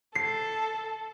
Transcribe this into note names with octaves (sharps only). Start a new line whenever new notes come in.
A4 C7